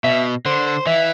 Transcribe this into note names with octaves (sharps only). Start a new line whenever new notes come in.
B2 E5
D3 C5
C5
E3 E5